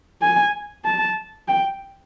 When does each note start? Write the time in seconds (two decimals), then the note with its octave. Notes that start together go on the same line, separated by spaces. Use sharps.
0.22 G#5
0.85 A5
1.48 G5